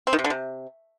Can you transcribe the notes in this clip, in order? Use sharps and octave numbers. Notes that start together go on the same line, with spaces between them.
C4
D#3
C3
D3
C3